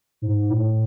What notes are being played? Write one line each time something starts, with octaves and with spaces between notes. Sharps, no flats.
G#2
A2